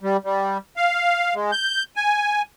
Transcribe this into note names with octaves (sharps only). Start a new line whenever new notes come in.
G3
G3
F5
G#3
G6
G#5